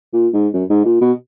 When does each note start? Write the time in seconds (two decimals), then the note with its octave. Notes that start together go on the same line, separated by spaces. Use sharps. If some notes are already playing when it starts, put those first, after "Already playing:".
0.13 A#2
0.34 G#2
0.54 F#2
0.70 G#2
0.85 A#2
1.01 B2